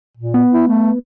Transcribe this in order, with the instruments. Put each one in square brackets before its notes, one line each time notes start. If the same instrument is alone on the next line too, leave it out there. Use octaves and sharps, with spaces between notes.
[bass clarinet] A#2
[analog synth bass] B3
[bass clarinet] E4
A3